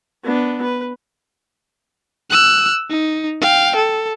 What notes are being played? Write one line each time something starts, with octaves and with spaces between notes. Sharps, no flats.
B3 D4
B4
E6 F#6
D#4
F5 G5
A4